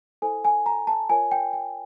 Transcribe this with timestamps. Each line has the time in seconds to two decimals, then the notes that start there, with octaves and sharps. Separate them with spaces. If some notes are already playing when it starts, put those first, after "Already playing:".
0.22 E4 A4 C5 G#5
0.45 G#5
0.66 A#5
0.87 A5
1.09 F4 A#4 C#5 G#5
1.31 G5
1.53 G5